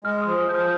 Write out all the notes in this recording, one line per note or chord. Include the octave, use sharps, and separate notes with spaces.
G#3 F6
D#6
F3
F6
F3 G6
F6